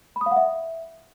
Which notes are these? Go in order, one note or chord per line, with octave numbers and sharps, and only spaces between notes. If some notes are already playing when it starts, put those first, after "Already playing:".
B5
D#6
F5
F#5
E5